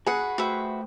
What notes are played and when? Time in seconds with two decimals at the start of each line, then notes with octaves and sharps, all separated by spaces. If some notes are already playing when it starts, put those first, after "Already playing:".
0.06 F#4 G#4 B4 F#5
0.38 A3 F#4 B4 C5 E5 G5